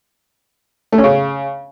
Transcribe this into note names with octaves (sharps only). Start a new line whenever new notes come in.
A3
C#4
C#3